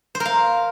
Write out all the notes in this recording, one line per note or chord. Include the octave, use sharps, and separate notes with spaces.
C5
A#4
F5